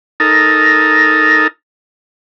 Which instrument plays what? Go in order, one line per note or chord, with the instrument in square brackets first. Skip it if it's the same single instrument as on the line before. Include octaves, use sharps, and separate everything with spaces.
[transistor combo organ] D#4 A4 A#4